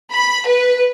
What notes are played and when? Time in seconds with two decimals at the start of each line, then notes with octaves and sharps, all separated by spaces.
0.13 B5
0.47 B4